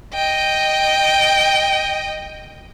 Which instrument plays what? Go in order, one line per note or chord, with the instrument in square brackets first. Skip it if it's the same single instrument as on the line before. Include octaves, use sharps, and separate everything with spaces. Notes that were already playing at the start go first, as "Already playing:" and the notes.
[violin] D#5 G5